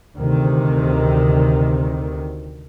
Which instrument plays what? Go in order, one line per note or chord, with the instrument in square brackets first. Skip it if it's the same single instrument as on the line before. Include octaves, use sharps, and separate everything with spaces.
[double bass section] D2 C3 D#3